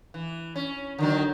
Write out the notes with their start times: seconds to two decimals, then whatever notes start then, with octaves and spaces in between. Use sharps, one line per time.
0.14 E3
0.56 C#4
0.98 D3 D#3 F#3